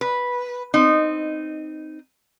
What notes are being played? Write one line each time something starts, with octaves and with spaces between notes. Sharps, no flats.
B4
C4 D#4